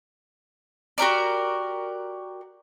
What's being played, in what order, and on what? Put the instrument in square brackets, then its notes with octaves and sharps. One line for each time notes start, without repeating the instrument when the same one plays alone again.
[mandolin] F#4 G4 A#4 D5